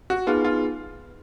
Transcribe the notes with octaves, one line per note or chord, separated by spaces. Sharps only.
F#4
B3 D#4 F4 G#4 B4
F4